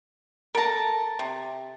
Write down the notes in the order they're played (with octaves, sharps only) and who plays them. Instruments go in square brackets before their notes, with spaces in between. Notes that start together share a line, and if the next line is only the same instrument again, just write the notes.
[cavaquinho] A4 A5 [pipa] A#4 A#5
[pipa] C3